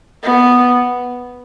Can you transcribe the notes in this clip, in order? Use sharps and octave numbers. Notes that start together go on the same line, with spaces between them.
B3